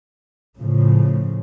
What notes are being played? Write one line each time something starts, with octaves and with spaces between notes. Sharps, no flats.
A2 C#3 F3